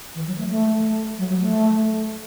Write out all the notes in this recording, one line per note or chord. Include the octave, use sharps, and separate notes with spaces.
E3
F#3
A3
A3
F#3
F#3
A3